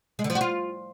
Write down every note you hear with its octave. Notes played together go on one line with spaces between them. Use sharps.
G#3
D3
F3
F#4
F4